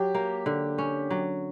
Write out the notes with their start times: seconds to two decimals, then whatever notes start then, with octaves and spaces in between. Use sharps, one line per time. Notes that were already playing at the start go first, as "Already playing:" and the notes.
Already playing: F#3 G4
0.15 A#3
0.46 D3
0.78 C#4
1.11 F#3